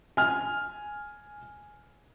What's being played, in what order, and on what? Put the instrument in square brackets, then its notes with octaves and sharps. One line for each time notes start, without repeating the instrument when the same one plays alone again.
[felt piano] G#5 F6